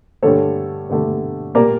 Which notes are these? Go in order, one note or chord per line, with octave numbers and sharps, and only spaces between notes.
G2 D3 A3 A4 C#5
G2 D3 A3
A#2 G3 A#3 A#4 D5